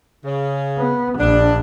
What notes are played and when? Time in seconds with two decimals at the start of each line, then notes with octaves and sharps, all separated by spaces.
0.24 C#3
0.78 B3
1.19 A#1 D4